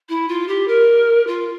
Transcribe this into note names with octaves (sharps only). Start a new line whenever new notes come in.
E4
F4
G4
A#4
F4